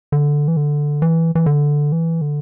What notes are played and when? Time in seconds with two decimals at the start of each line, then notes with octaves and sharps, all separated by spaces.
0.12 D3
0.48 E3
0.57 D3
1.02 E3
1.35 E3
1.46 D3
1.92 E3
2.21 D3